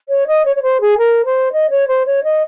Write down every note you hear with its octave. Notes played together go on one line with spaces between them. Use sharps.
C#5
D#5
C#5
C#5
C5
G#4
A#4
C5
D#5
C#5
C5
C#5
D#5